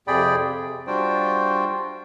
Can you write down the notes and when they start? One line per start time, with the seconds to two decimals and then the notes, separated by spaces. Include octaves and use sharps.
0.08 F2 C3 G#4 D5 G5 B5
0.42 C3
0.87 G3 D4 F4 F#4 C5 G5